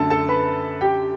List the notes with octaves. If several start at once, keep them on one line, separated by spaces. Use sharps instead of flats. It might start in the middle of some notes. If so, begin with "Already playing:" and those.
Already playing: F#2 D3 A3 A4 A5
A4 A5
B4 B5
G4 G5